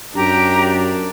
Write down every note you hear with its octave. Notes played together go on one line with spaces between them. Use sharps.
F#2 D4 G4 A#5